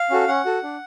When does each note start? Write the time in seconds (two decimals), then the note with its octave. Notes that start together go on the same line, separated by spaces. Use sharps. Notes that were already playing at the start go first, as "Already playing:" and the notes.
Already playing: F5
0.10 C#4 F#4 A4
0.28 C#4 F#5
0.45 F#4 A4
0.63 D4